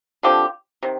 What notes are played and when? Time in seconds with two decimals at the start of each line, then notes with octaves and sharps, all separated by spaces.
0.23 D3 F3 C4 G4
0.83 C3 D#3